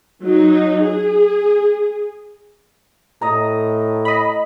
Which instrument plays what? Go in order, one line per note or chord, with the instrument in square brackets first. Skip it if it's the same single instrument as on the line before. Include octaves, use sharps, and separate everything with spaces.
[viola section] F#3 D#4
G#4
[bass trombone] A2 [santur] D#5 A#5
[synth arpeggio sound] D#5 B5